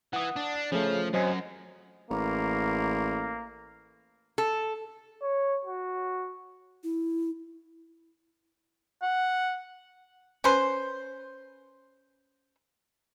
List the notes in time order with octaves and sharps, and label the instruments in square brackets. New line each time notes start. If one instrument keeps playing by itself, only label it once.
[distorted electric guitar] E3 [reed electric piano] F#5 D#6
[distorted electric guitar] D4
[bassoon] C#3 [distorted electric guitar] F3 [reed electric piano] A3 C#4
[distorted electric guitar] F#2 [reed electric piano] F#3 D#5 G#5 [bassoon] C4
[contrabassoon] A1 [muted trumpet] A#3
[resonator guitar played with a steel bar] A4
[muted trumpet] C#5
F#4
[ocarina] E4
[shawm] F#5
[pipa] C#4 B4 C5